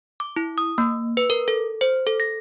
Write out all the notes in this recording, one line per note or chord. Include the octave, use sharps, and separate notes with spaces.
D6
E4
D#6
A#3
B4
A#4
A4
C5
A4
A#6